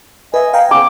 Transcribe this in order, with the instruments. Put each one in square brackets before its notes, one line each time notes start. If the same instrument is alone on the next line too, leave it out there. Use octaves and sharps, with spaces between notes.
[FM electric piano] B4 E5 [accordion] D#5 G#5
[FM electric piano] F5 G5 A#5
[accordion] C#3 B3 C#4 [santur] D6